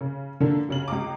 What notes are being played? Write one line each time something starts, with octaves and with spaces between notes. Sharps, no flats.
C#3
D3 A#3 D4
B1 C#3 F#7
C#2 D#5 A#5 D6